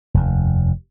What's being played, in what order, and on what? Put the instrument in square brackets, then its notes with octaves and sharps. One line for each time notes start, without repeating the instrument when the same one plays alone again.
[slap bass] F1 D#2